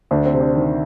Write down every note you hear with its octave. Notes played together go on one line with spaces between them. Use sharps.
D2 D4
C4
C3
D4
D#3